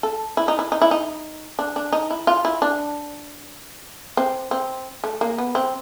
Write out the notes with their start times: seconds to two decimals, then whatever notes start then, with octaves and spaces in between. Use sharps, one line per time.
0.03 A4
0.37 E4
0.48 D#4
0.59 E4
0.72 D#4
0.82 E4
0.91 D#4
1.59 D4
1.76 D4
1.93 D#4
2.10 E4
2.27 F4
2.45 E4
2.62 D4
4.17 C4
4.51 C4
5.04 A3
5.21 A#3
5.38 B3
5.55 C4